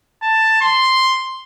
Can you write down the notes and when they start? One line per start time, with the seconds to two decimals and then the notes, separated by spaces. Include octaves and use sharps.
0.23 A5
0.61 C6